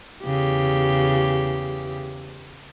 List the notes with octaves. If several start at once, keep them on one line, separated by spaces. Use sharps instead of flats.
E2 C#3 G4